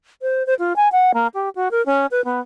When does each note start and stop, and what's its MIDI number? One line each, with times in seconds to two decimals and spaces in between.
0.22 0.46 72
0.47 0.54 72
0.59 0.73 65
0.76 0.89 80
0.92 1.12 78
1.14 1.27 58
1.34 1.49 67
1.55 1.69 66
1.71 1.84 70
1.86 2.06 61
2.11 2.24 71
2.25 2.40 59